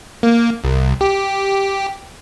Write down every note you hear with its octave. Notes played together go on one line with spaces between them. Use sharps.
A#3
C2
G4